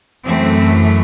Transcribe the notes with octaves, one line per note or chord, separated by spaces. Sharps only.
F#2 E3 A3 C4